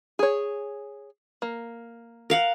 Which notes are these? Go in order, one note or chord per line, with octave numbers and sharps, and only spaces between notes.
G#4 C#5
A#3
A#4 F5 F#5